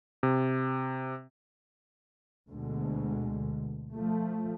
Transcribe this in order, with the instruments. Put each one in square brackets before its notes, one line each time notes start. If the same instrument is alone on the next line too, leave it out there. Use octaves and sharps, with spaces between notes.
[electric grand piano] C3
[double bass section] D2 B2 D3 G#3
F3 A3